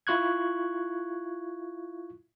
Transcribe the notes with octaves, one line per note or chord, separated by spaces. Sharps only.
E4 F4 C#6 F#6 G#6